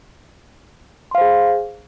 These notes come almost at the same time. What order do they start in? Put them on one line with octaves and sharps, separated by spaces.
C6 F5 C5 G#4